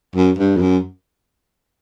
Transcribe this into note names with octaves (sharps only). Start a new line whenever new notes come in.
F#2
G2
F2
F#2